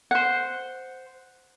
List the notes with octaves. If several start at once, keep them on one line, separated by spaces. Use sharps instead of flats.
C5 F#5